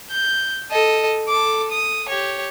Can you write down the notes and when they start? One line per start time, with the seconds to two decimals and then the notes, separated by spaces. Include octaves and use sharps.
0.11 G6
0.71 A4 D#5
1.28 A4 D6
1.71 D#6
2.09 G4 C#5